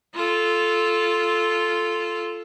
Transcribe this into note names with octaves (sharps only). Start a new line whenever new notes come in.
F4 A4